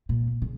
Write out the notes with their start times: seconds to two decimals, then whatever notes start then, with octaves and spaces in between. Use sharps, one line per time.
0.09 A#2
0.42 C#3